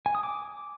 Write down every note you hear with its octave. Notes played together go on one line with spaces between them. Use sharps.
G#5
D#6
D6